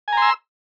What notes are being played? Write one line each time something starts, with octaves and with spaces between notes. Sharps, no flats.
G#5 A#5 C6 E6